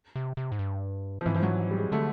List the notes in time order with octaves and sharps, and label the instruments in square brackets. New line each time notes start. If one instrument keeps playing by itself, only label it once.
[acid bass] C3
C3
G#2
G2
[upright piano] F3
[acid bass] G#2 [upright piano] E3
[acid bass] G2 [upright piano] F3
[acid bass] G#2 [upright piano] F#3
[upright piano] G3
G#3
[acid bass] D3 [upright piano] A3